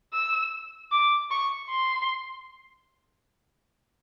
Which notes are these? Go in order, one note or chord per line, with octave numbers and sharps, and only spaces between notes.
E6
D6
C#6
C6